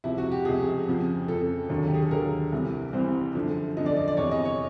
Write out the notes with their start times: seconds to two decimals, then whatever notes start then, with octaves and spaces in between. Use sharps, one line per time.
0.04 C#2 C3 F3 E4
0.18 F#4
0.32 G4
0.45 C#2 C3 F3 G#4
0.87 F2 C#3 F3
1.28 F2 C#3 F3 A4
1.69 D#2 D3 F#3
1.88 G4
1.95 G#4
2.02 A4
2.11 D#2 D3 F#3 A#4
2.52 C2 C3 E3
2.93 C2 C3 E3 C5
3.35 F#2 D3 F3
3.76 F#2 D3 F3 D#5
3.86 D5
3.97 D#5
4.08 D5
4.17 E2 C3 E3 C#5
4.32 D#5
4.45 C#5